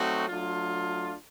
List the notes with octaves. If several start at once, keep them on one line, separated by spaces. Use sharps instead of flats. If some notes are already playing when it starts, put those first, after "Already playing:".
Already playing: F#3 A3 C4 D#4 F#4
F#3 A3 D4 F4